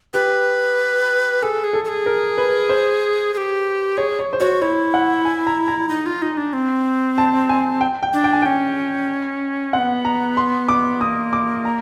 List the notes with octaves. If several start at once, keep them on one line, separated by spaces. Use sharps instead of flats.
G4 B4
G#4 A4
G#4
A4
A4
G#4
A#4
B4
C5
G#4
G4
G#4 C#5
C#5
C5
F#4 C#5
E4 C#5
F#5
G#5
A#5
A#5
D#4
F4
D#4
D4
C4
A5
G#5
G5
G5
D4
G5
G#5
C#4 G5
C4 F#5
B3
A#5
C6
D6
A#3 D#6
D6
A#5